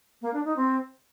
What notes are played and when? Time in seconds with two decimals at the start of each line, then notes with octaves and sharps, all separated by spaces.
0.22 A#3
0.33 D4
0.45 D#4
0.56 C4